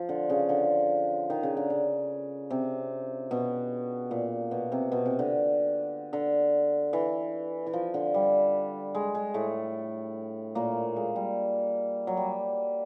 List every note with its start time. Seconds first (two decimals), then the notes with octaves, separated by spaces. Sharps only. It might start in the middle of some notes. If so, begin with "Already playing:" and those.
Already playing: F3
0.09 D3
0.29 C#3
0.49 D3
1.30 D#3
1.43 C#3
1.57 D3
1.70 C#3
2.50 C3
3.31 B2
4.11 A#2
4.51 B2
4.72 C3
4.92 B2
5.05 C3
5.19 D3
6.13 D3
6.93 E3
7.66 E3
7.73 F3
7.94 D3
8.14 G3
8.95 G#3
9.15 G#3
9.34 A2 A3
10.55 A#2 A#3
10.96 G#3
11.16 G3
12.07 F#3
12.17 G3